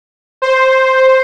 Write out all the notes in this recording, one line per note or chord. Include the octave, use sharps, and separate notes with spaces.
C5